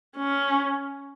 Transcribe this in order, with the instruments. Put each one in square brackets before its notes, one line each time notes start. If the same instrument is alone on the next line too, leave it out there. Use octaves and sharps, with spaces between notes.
[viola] C#4